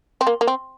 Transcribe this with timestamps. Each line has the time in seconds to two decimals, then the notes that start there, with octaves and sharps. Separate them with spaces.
0.21 C4
0.27 A#3
0.41 A#3
0.47 C4